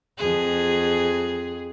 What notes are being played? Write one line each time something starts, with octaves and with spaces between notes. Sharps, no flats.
F2 G#4